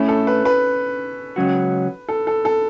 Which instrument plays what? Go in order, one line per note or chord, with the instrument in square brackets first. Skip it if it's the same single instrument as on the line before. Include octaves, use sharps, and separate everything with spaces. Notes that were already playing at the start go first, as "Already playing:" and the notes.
Already playing: [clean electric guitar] A2 A3 E4 [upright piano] C#4
[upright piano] A4
B4
B4
[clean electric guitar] C#2 C#3 F#3 C#4 F#4
[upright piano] A4
A4
A4